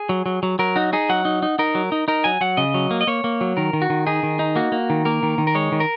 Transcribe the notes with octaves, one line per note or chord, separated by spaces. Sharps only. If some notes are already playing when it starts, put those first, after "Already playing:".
Already playing: G#4
F#3
F#3
F#3
F#3 A#4
D#4 F#4
D#4 G#4
F#3 F#5
D#4
D#4
D#4 A#4
F#3
D#4
D#4 A#4
F#3 G#5
F#3 F#5
C#3 D#5
F#3
A#3
D#5
A#3 C#5
A#3
F#3
D#3 A#4
D#3
F#4
D#3
D#4 G#4
D#3
D#4
A#3 F#4
A#3
D#3
A#3 A#4
D#3
D#3
A#4
G#3 C#5
D#3
A#4